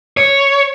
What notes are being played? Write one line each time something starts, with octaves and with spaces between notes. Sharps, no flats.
C#5